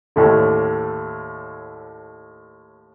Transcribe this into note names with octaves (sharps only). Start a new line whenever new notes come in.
D#2 A2 D3